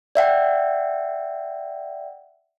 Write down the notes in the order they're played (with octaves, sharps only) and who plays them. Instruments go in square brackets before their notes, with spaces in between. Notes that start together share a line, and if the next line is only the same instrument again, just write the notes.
[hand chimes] D5 E5 F#5 G5